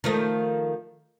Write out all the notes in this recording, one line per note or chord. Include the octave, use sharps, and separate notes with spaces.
D#3 F3 A3